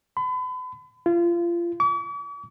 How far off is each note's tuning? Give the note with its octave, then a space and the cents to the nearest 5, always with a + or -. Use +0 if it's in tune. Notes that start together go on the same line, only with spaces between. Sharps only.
B5 +40
F4 -30
D6 -45